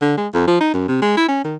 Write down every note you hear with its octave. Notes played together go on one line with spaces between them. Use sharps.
D3
G#3
F2
F3
D#4
F#2
C3
G#3
E4
C#4
D#3